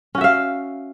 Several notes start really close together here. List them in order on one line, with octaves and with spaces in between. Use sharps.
C#4 F#4 E5 F5